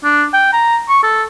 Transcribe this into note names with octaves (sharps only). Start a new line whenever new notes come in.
D4
G5
A#5
C#6
A4